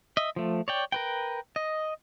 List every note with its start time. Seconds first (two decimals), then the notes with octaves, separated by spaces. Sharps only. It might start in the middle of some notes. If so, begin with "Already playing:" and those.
0.17 D#5 E5
0.36 F3 A3
0.68 C#5 D5 G5
0.92 A#4 B4 G5
1.56 D#5